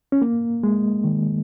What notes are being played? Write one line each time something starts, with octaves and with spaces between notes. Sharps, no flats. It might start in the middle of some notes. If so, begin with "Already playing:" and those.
C#4
A#3
G#3
D#3